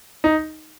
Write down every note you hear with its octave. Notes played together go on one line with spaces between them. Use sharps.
D#4